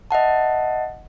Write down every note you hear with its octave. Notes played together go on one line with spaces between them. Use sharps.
D#5 E5 F#5 A5